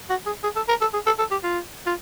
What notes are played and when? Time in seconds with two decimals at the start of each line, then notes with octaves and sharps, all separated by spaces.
0.10 F#4
0.26 G#4
0.43 G#4
0.56 A4
0.68 A#4
0.81 A4
0.93 G#4
1.06 A4
1.19 A4
1.31 G4
1.44 F4
1.86 F4